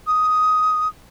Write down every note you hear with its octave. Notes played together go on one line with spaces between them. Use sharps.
D#6